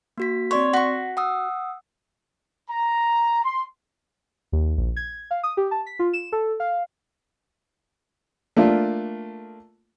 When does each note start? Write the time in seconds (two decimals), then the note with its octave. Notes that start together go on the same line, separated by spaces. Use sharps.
0.18 A#3 F#4 B6
0.51 C4 C#5 D5 C6
0.73 F#4 F#5 C#6 A#6 B6
1.17 F#5 D#6 E6
2.70 A#5
3.43 C6
4.52 D#2
4.78 A#1
4.96 G#6
5.31 F5
5.43 D#6
5.57 G4
5.71 A5
5.86 B6
5.99 F4
6.13 E7
6.32 A4
6.60 F5
8.57 A3 A#3 D4 F4